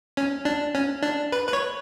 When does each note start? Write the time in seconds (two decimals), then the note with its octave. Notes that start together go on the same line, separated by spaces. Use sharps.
0.17 C#4
0.45 D4
0.75 C#4
1.02 D4
1.32 B4
1.48 B4
1.53 C#5